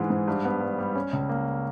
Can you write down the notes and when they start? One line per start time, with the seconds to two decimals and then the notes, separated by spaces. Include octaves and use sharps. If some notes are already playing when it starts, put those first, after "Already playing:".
Already playing: G#2 E3 G#3
0.10 G#2
0.28 G2
0.45 B3
0.61 G2
0.78 G3
0.95 C#4
1.13 C#2
1.29 A#3